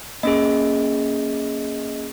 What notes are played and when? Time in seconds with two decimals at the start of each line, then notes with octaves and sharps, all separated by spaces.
0.23 A#3 C#4 G#4 D#5